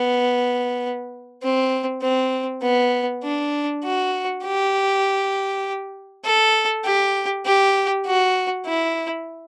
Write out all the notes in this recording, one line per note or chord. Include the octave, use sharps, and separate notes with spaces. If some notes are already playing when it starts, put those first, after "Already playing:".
Already playing: B3
C4
C4
B3
D4
F#4
G4
A4
G4
G4
F#4
E4